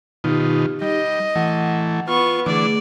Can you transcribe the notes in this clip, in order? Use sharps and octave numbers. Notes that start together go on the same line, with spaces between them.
B2 D#3 D#4 F4 G4
G3 D#5
E3 A3 F#5
B3 F4 C#6
D3 E3 A3 D4 G#4 D5